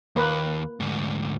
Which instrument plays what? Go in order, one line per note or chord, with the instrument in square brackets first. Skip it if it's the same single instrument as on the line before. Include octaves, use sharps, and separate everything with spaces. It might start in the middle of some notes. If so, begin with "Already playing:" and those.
[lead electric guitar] D#2 [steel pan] A#3 B4
[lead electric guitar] D2 G#2